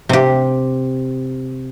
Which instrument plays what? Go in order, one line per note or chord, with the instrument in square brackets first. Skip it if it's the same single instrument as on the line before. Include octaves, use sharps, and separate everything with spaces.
[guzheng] C3 G4